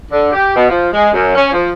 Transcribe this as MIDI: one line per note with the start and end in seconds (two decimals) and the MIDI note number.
0.10 0.31 50
0.32 0.53 67
0.55 0.67 47
0.69 0.89 53
0.93 1.11 56
1.14 1.33 42
1.35 1.49 61
1.52 1.70 53